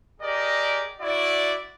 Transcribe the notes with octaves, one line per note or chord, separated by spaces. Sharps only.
G4 G#4 A#4 D5 D#5
E4 F#4 D5